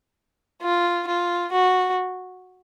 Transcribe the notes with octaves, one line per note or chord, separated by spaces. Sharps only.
F4
F4
F#4